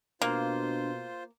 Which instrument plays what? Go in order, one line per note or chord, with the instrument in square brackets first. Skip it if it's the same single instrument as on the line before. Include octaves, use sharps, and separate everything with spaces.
[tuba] B2 [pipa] A#3 [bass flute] D4 [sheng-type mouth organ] F4 C5